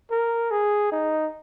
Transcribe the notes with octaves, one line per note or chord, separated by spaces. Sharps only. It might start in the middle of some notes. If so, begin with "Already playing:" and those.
A#4
G#4
D#4